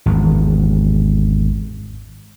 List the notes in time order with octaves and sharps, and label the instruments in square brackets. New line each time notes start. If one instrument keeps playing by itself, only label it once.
[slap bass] G#1 E2